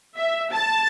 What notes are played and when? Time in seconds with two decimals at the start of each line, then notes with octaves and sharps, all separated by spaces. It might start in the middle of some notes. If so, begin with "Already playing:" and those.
0.16 E5
0.52 A5